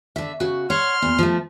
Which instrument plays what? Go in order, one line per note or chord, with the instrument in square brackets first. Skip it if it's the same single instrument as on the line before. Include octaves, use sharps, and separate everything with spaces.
[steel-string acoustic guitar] D3 E5
C#3 F#4
[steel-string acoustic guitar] C#5 F#5 [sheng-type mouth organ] C6 F6
[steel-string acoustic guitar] E2 A#2
F3 A3